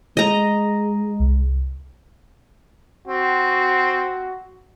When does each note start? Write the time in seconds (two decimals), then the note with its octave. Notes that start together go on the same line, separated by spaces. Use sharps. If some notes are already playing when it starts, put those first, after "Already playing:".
0.17 G#3 D#5 A#5
1.19 C2
3.08 C4 F#4